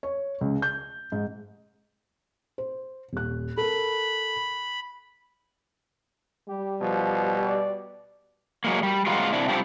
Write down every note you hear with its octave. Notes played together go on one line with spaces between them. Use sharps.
C#5
C#2
G6
G#2
C5
D#1 F#6
A4 A#4 B5
G3 G4
B2 F3
D5
F#3 G#3 A#3
G3
G#3 A#3 C4 F4 F#4
C3 D4 E4
G3 C4 D4 E4 F4 G4